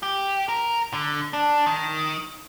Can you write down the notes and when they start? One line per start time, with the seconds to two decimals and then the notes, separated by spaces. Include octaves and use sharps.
0.03 G4
0.48 A#4
0.93 D3
1.33 D4
1.66 D#3